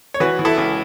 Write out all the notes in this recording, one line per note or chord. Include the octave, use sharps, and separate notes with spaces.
C#5
E3 F#4 B4
E3
E4 A4
C#2